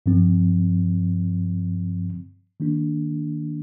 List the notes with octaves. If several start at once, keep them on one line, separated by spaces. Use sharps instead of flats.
G2 F3 C4
D#3 A#3 D4